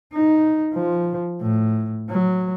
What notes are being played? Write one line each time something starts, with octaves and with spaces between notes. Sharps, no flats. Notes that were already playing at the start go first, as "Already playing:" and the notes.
D#4
F3
A2
F#3